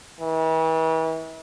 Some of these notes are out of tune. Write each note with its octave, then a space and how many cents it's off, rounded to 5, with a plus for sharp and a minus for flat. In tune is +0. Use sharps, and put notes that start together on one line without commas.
E3 -40